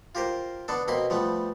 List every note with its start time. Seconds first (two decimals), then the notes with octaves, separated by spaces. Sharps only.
0.15 F4 G4 A#4 C5
0.68 D3 B3 D4 A4
0.88 B2 A#3 C4 B5 C6
1.10 F3 G3 A3 B3